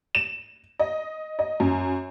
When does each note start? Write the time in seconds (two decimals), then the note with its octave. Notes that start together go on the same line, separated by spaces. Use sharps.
0.15 E7
0.79 D#5
1.39 D#5
1.60 F#2